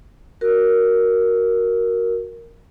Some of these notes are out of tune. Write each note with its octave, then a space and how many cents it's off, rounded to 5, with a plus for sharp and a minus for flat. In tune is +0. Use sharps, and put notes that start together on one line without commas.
F#4 +0 A#4 +0